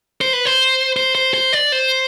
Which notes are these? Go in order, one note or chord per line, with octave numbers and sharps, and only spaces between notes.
C5
B4
C5
C5
C5
C5
D5
C5